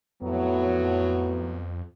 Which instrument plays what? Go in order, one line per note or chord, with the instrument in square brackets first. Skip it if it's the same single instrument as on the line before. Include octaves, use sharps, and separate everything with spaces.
[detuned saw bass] F2 [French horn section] A2 F#3 [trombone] B3